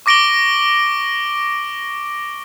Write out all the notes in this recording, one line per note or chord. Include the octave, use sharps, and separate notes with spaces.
C#6 D6 A#6 D7 F#7 G7